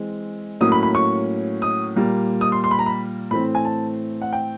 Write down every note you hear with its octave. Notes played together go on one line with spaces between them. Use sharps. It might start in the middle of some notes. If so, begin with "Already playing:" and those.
Already playing: E3 G#3 C4
A2 F#3 A#3 C#4 D#6
B5
B5
C#6
D#6
A#2 G3 A#3
D#6
C6
C6
B5
A#5
B5
A2 E3 A3 C4 B5
G#5
A5
F#5
G5